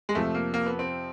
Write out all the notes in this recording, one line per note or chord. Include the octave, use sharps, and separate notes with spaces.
G#3
F2 C3 F3 A3
A#3
A#3
B3
C4